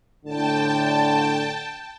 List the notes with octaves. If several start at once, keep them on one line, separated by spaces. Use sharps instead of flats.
A2 D3 G5 A5